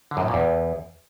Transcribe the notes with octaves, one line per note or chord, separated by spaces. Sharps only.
D3
F#2
A2
A#2
E2